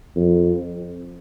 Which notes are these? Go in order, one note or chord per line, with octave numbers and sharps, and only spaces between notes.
F2